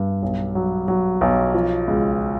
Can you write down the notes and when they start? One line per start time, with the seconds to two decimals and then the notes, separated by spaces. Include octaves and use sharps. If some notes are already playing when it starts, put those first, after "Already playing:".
Already playing: G2
0.22 B1
0.55 F#3
0.88 F#3
1.21 B1
1.54 F3
1.88 C#2